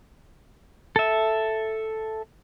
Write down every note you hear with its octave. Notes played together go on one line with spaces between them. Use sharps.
A4 E5